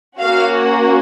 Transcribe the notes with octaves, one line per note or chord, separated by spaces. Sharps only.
A#3 C#4 F#4 F5